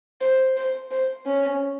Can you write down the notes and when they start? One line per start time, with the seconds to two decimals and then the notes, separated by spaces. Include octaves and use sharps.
0.21 C5
0.56 C5
0.91 C5
1.25 C#4